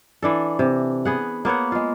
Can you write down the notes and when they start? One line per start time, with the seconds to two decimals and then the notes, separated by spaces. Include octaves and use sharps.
0.22 E3 D4 A4
0.59 C3
1.05 B3 G#4 F#5
1.45 A#3 B3 C#5 F#5
1.72 G#3 F4